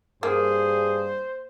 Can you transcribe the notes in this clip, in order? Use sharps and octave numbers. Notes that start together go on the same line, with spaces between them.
G2 A#3 G#4 C5